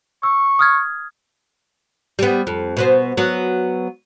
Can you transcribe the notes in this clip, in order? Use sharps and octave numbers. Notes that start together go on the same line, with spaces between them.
C#6 E6
D#6 F6 G#6
G3 B3
F2
B2 B3 C5
F#3 B3